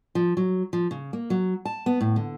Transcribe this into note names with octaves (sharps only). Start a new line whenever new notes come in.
F3
F#3
F3
C#3
A#3
F#3
A5
B3
A2
D3